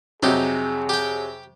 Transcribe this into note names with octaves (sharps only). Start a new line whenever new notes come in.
F2 C3 F#3 D#4 G4 G#4
G4 G5